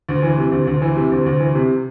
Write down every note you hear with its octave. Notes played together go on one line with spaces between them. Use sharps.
D2
E3
C3
D2
D2
E3
C3
D2
D2
E3
C3